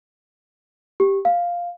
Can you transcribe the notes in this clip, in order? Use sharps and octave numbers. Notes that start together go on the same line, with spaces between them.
G4
F5